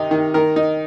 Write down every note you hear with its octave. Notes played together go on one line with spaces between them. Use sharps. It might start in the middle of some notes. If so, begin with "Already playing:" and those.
Already playing: C3 D#3 D#4
D#3
D#3 A#4
D#4